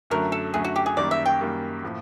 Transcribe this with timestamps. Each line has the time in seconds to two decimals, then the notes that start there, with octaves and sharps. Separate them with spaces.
0.10 F#2 D3 F#3 A3 A#4
0.32 A4
0.54 F#2 D3 F#3 A3 G#4
0.64 F#4
0.76 G4
0.86 G#4
0.97 F#2 D#3 G3 A#3 D5
1.11 E5
1.26 G5
1.40 F#2 D#3 G3 A#3
1.83 A2 F3 A#3